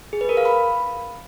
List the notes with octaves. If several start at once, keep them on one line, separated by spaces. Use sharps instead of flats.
G#4
B4
A#4
F5
B5